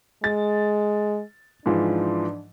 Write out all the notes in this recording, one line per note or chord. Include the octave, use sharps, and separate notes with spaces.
G#3 A6
G#2 E3 F3 D4